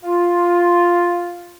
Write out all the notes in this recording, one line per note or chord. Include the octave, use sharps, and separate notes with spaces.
F4